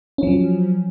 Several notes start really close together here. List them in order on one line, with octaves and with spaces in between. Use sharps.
C#4 F3 F#3